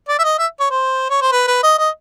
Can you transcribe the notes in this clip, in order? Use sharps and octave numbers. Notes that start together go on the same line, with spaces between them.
D5
E5
D#5
E5
C#5
C5
C#5
C5
B4
B4
D#5
D#5